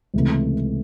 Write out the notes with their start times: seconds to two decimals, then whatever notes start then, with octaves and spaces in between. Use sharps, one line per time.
0.14 C#2 C3 E3 A3